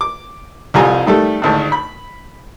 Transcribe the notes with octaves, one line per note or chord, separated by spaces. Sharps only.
D6
C2 F2 G3 F4 G#5 A#5
D#3 G3 A3 A4
G#1 D2 A2
B5